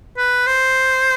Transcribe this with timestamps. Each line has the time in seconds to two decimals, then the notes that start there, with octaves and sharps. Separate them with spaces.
0.17 B4
0.47 C5